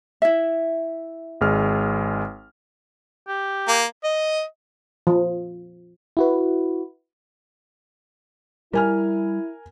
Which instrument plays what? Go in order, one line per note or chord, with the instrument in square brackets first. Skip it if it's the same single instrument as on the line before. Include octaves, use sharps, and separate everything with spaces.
[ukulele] E4 E5
[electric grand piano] G#1 G#3 F6
[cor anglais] G4
[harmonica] A#3
D#5
[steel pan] F3
[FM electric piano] E4 F#4 B4
[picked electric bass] G3 [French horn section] E4 [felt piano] A#4 G#5 F6